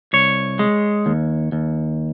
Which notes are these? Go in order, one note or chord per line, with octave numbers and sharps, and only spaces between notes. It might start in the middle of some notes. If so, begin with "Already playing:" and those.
C2 C#5
G#3
D#2
D#2